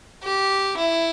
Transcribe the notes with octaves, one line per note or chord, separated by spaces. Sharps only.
G4
E4